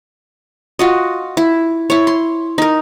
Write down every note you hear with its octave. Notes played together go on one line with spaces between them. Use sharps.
F4 F#4 D#5
E4
E4 C#5
C6
D#4 A#4